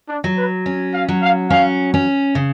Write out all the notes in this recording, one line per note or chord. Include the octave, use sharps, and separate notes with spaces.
D4
F#3
B4
C#4
F5
F#3
F5
C#4 F5
C#4
C#3